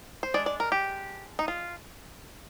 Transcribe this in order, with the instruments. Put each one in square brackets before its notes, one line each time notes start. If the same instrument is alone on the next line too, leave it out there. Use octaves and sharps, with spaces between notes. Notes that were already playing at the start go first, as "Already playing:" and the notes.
[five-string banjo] C5
G#3 D4 D5
D5
A#4
G4
D#4
F4